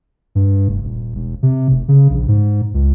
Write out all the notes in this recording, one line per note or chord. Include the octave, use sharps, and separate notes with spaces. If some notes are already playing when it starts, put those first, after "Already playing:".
G2
F1
D#1
E1
C3
F1
C#3
A#1
G#2
C#2